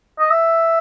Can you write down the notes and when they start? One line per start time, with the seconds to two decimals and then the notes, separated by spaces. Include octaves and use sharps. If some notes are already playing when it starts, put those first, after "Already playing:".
0.19 D#5
0.31 E5